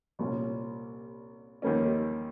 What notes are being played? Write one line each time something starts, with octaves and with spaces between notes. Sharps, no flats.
C2 A#2 G3 C#4
D#2 D#3 G3 A#3 C#4